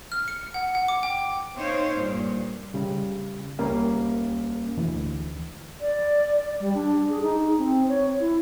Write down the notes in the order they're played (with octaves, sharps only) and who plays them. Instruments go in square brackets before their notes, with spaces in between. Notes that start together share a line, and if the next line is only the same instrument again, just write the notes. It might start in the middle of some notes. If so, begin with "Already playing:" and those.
[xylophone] F6
C#7
F#5
F#5
D6
G5
[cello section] C4 D#4 C5 C#5 F5
G2 A#2
[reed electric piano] C#3 G3
C#2 G3 A#3 C#4 F5
D2 E3
[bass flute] D5
G3
D4
G#4
D#4
C4
C#5
E4